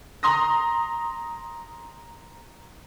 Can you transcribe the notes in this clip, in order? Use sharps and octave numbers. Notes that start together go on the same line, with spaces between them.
A#5 C6 D#6 A#6